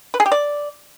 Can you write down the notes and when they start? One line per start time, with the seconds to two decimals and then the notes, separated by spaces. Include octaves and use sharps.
0.14 B4
0.20 G#4
0.26 G4
0.32 D5